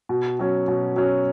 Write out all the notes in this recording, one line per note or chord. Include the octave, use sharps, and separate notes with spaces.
B2
F#3 C#4
B2
F#3 C#4